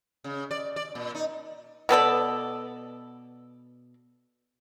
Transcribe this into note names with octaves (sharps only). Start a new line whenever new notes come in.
C#3
D5
D5
A#2
D#4
B2 B3 A4 D5